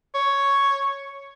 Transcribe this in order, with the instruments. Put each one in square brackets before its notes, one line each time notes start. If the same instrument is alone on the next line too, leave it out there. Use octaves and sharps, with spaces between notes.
[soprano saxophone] C#5